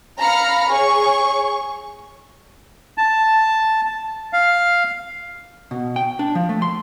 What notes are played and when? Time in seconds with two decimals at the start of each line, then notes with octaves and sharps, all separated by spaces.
0.19 F5 A#5 B5 F6 C#7
0.68 G#4 C#5 C#6
2.98 A5
4.33 F5
5.71 B2
5.96 G5
6.19 D4
6.35 F3
6.49 A3
6.62 C6